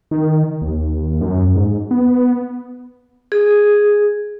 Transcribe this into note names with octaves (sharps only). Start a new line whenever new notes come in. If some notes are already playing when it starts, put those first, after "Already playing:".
D#3
D#2
F#2
G#2
B3
G#4